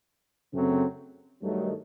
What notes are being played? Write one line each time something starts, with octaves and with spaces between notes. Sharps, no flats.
F#2 C#3 F#3 A3 C4
G2 D#3 F#3 A3